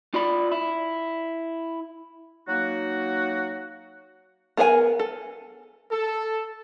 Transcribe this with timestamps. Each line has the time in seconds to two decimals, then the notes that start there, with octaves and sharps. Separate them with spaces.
0.14 F4 D5 B5
0.52 E4
2.48 F#3 A#3 D#4 F#4
4.57 B3 G#4 A#4 E5 G#5
4.99 A4
5.91 A4